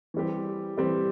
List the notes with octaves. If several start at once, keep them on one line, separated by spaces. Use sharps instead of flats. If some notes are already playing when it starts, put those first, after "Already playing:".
E3 G3 C4 G4
E3 G3 C4 G4